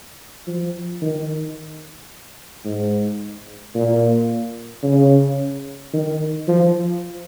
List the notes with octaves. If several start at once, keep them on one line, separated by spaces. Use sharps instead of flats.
F3
D#3
G#2
A#2
C#3
D#3
F3